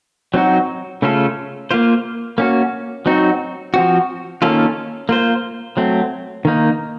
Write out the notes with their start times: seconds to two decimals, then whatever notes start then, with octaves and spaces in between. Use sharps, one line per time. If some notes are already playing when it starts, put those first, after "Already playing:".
0.34 F#3 C4 D#4 F#4
1.02 C#3 A3 C#4 F4 A4
1.71 A#3 F4 C5
2.38 A#3 C#4 F#4
3.06 F#3 C4 D#4 F#4
3.74 F3 C4 F#4
4.42 D#3 A#3 C#4 F4 A4
5.09 A#3 F4 C5
5.77 F#3 A3 C4
6.45 D#3 A#3 D#4